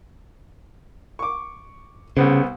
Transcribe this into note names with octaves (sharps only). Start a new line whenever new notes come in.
C#6 D6
C2 C#3 B3 C5